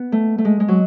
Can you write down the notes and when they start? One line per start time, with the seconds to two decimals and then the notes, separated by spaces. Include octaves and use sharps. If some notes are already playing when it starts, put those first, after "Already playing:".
Already playing: B3
0.12 A3
0.38 A3
0.45 G#3
0.60 G#3
0.68 F#3